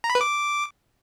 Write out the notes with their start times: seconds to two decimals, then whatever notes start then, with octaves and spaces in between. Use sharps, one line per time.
0.04 A#5
0.10 B5
0.15 B4
0.21 D6